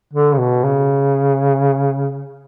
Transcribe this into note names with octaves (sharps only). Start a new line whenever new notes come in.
D3
C#3
B2
C#3